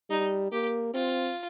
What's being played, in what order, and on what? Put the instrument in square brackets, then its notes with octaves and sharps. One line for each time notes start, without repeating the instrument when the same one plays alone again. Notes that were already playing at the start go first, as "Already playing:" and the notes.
[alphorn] G3 [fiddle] D#4
[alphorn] A#3 [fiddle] G4
[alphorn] C4 [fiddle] F4